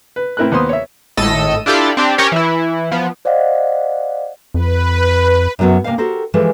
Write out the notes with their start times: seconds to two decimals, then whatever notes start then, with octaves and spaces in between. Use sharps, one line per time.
0.16 B4
0.37 A2 C4 E4 A#4 B4 F#6
0.52 D#2 B3 B4 C5 C6 D#6
0.69 C#5 E5
1.17 G#1 A2 A4 D#5 E6 D#7
1.66 D4 E4 F4 G4 A4 D5
1.97 C4 D4 G4
2.18 C#4 G4 A#4 C#5
2.32 E3 E4
2.91 F3 B3
3.25 C5 D5 D#5 F5 F#5
4.54 F2 B4
5.59 F#2 C3 F#3 B3 C#4
5.84 C3 A#3 C#4 C5 F5
5.98 F#4 G4 A4 A#4 C5
6.34 E3 F3 G#3 G4 A4